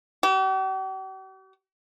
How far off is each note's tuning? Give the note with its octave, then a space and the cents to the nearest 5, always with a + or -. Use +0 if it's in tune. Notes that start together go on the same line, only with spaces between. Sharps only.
G4 -45